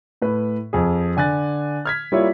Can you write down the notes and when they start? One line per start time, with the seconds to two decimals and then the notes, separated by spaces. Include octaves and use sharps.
0.22 A2 B4
0.73 F2 G#4
1.17 D3 G#5 F#6 A6
1.85 F6 G#6 B6
2.12 G3 A#3 E4 F4 C#5